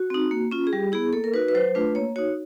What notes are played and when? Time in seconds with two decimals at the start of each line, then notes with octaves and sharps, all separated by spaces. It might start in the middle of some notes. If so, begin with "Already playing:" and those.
Already playing: F#4
0.10 C4 D#4
0.31 A#3
0.51 C#4 F4
0.67 G#4
0.73 G3 G4
0.92 B3 E4 G#4
1.13 A#3 A4
1.24 A#4
1.34 D#4 F#4 B4
1.48 B4
1.55 F#3 C5
1.75 A3 D4 F4 B4
1.95 A#3 C#5
2.16 D#4 F#4 C#5